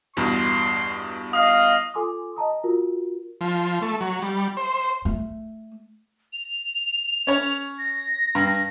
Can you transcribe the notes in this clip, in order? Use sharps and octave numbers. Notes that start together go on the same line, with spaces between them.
E2 G2 B2 C6
D#5 F5 D#6
F4 A4 G#5 C6 D6 D#6
D#5 A5 A#5 D#6
F4 F#4 A#4
F3
A3
F#3
G3
C5
A3
F7
C#4 C#5
A#6
G2